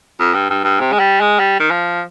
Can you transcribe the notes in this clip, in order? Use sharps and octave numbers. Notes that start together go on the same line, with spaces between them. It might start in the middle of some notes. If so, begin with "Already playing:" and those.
F2
G2
G2
G2
C3
G#3
G3
G#3
G3
D#3
F3